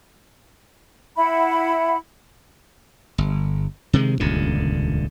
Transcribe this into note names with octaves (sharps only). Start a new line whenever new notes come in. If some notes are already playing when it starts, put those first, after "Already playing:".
E4 F#5 B5
G1
C3 D#3 G#3
D#1 C#2 G2 D3